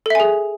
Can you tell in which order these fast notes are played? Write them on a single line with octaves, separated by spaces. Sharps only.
A4 E5 G#5 G#4